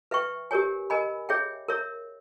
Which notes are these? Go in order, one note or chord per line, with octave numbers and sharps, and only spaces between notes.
B4 E5 G5 C#6
G4 A#4 C#5 G#5
A#4 D#5 G#5 B5
G#4 C#5 E5 G5
A#4 C#5 E5